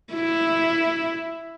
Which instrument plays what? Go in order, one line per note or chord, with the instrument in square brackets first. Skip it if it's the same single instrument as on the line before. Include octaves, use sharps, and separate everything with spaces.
[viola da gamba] E4